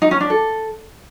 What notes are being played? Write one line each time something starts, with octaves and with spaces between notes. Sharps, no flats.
D#4
C#4
D4
A4